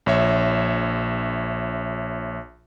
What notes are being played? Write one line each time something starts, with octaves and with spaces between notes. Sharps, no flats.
A#1 C#5 E5